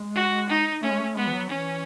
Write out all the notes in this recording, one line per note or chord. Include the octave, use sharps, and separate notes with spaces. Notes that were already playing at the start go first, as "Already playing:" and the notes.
Already playing: G#3
F#4
D#4
A3 C#4
G#3
A3
G#3 B3
E3
F#3
E3 C#4